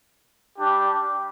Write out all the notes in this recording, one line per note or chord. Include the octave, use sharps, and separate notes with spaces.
G3 D4 G4